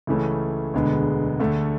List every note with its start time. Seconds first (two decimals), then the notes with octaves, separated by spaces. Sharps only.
0.07 C#2 C#3 E3 A3 C#4
0.74 E1 D2 D3 G#3 B3
1.40 D2 D3 A3